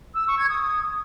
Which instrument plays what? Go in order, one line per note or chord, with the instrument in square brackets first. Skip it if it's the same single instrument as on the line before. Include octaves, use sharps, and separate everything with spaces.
[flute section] E6
C#6
G#6
D#6